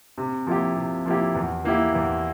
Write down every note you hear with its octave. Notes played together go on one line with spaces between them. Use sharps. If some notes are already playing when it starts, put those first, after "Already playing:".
C3
F3 A#3 E4 G4
C3
F3 A#3 E4 G4
E2
E3 A#3 E4 G4
E2